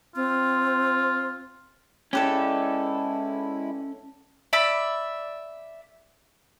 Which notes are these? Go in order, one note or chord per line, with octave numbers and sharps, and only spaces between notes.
C4 F4
G#3 C#4 E4 G4 A4 B4 D5
D5 E5 B5